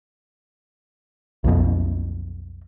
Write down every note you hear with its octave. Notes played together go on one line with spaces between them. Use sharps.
B1 F2 B2